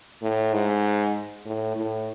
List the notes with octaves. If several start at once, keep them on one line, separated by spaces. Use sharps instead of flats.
A2
G#2
A2
A2